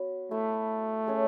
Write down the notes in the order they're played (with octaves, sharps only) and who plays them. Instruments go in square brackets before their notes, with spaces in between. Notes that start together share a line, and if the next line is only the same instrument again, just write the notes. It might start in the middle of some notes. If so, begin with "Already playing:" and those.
Already playing: [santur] B3 F#4 C#5
[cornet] A3 [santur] E4 A4 E5
[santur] G#3 C#4 G#4 C#5